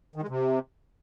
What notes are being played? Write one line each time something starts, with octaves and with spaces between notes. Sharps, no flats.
D#3
G#3
C3